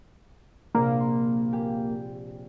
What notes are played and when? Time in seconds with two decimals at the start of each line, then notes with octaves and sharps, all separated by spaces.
0.75 A#1 C3 A#3 A#5
1.00 C6
1.52 G4 G#5